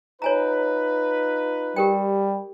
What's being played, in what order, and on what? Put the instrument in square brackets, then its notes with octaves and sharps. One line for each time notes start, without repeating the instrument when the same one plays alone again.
[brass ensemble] D#4 F4 B4 [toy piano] C#5 G#5 A#5
[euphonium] G3 [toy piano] G4 A#4 G5